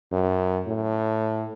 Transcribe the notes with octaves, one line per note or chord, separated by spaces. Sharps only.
F#2
A2